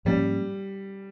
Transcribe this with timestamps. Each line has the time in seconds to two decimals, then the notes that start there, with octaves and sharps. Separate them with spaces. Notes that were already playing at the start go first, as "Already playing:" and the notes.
0.05 G#2 F3 G3 A#3 C#4